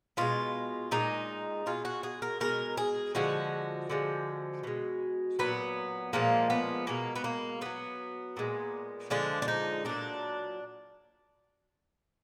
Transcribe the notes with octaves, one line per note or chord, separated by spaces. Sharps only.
B2 G#3 F4
A#2 G#3 D#4
B2 G#3 F4
F#4
G#4
A#4
B2 G#3 A#4
G#4
D3 F3 G#3 F#4
D3 F3 G#3
B2 G#3
A#2 F#3 B3
A#2 F3 G#3 A#3
B3
B2 G#3 A#3
B3
A#3
D3 F#3 B3
A#2 G#3
D3 F3 G#3 D4
D4
D#4
A#2 F#3 D4